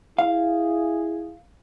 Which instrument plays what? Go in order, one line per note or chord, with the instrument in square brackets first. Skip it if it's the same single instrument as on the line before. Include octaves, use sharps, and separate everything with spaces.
[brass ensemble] E4 G#4 [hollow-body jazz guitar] F5